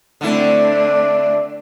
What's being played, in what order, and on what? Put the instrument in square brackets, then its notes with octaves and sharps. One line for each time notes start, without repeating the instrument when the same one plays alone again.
[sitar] D3 E4 [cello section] A3 C4 D4